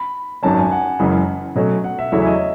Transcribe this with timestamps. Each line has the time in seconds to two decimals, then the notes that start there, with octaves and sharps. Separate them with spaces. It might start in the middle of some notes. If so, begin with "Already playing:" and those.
Already playing: B5
0.43 G#1 F#2 D#3 F#3 C#4 A5
0.58 G#5
0.72 F#5
0.99 F#1 F#2 C#3 E3 G#3
1.56 B2 F#3 A3 C#4
1.84 F#5
1.99 E5
2.12 E2 C#3 F#3 A3 E4 C#5
2.22 E5
2.27 D#5